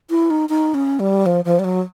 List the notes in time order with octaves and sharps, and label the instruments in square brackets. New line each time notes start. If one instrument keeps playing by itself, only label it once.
[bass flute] E4
D#4
D#4
C#4
G3
F3
F3
G3
F#3